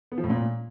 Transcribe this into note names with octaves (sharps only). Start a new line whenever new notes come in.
B3
F3
A2
A#2